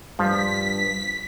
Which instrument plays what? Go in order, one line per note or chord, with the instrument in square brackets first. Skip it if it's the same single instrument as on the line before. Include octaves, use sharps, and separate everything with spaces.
[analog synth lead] G2 [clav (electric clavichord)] F3 [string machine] B6